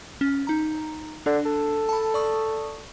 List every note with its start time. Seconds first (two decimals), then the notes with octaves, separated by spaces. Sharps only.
0.21 C#4
0.47 D#4 A#5
1.26 D3 D4
1.45 A4
1.89 A5 B5
2.14 D5 C#6 D#6